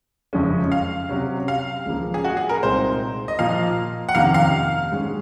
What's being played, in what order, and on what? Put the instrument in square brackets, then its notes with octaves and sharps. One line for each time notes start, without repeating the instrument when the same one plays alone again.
[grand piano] F#1 F2 C#3 G#3 C#4
[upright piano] F5
[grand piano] C3 F#3 C#4
[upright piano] F5
[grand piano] C#2 C#3 F3 A#3
[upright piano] G#4
F#4
G#4
A#4
[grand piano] C2 A#2 G#3 C4 D#4 [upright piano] C5
[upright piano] D#5
[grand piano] A#2 F3 A#3 [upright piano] F5
[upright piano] F#5
[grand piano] F2 C3 D#3 A#3 C#4 [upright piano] F5
[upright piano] F5
[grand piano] G#2 F#3 C#4 G#4